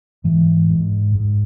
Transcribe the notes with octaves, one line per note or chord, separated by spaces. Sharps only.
G#2 E3
G#2
G#2